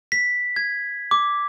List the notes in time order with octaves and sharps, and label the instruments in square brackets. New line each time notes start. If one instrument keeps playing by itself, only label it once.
[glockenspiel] B6
G#6
D6